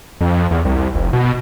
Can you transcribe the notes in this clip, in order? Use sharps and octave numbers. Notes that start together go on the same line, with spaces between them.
F2
E2
C2
F1
B2